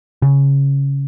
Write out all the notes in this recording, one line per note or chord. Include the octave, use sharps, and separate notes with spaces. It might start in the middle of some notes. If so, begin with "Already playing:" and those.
C#3